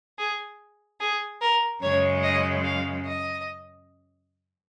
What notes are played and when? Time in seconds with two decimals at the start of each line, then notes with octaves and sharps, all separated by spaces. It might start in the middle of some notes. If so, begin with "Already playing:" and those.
0.18 G#4
1.00 G#4
1.41 A#4
1.82 F#2 C#3 G#3 C#5
2.24 D#5
2.65 F5
3.06 D#5